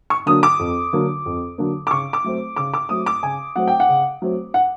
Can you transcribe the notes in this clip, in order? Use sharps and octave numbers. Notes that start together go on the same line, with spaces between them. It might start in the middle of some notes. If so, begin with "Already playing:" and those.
C#6
D3 F#3 A#3 D4 D#6
D6
F2
D3 F#3 A#3 D4
F2
D3 F#3 A#3 D4
D6
C#3 C#6
D6
F#3 A3 C4
C#3 D6
D6
F#3 A3 C4 D#6
D6
C#3 G#5
F#3 A3 C4 F#5
G5
F#5
C#3
F#3 A3 C4
F#5